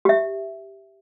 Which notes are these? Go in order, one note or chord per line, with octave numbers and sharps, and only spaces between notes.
G4 E5